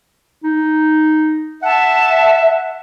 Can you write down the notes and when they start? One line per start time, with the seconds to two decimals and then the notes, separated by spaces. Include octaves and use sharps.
0.44 D#4
1.63 E5 F#5 A5